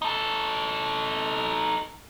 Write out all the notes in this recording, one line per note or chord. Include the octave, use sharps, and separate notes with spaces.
D#4 A4